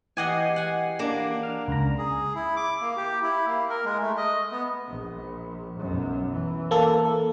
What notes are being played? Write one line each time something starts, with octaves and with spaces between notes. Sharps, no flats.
E3 G4 D#5 F#5 G#5 C7
F#5 G#5
A#3 D4
F6
C#2 A#5
G#4
E4
D6
A#3
G4
E4
A#3
A#4
G#3
A3
D#5
B3
A#1
B1 F#2
E3
A#3 A4